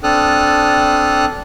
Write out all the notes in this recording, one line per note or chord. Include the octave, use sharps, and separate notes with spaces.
C4 D4 A4 D#6 F6 F#6